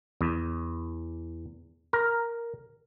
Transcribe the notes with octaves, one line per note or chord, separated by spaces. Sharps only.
E2
A#4